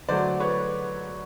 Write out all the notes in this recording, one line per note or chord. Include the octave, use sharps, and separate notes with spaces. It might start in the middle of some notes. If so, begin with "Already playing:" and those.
D3 F#3 A3 C5 D5
B4 C#5